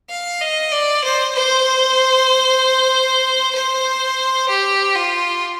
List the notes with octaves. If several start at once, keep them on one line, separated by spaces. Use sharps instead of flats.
F5
D#5
D5
C5
C5
C5
G4
F4